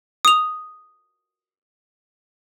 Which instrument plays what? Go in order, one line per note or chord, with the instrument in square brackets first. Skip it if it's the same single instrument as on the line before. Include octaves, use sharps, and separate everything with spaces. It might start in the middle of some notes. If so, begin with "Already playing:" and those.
[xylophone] D#6 F7